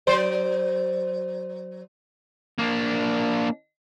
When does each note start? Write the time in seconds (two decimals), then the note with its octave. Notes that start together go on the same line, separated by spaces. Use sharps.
0.07 F#3 C5 D5
2.58 A#3 D4